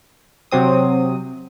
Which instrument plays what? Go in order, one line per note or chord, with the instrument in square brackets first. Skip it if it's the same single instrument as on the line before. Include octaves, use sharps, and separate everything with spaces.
[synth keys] C3 F#3 C4 D#6